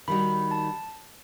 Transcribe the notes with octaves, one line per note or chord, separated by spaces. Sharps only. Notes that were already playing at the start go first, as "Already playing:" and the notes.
D#3 G3 D#4 F#4 B5
B5
A5